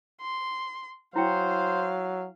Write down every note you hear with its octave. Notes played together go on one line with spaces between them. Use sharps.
C6
F#3 E4 C5 F5 G5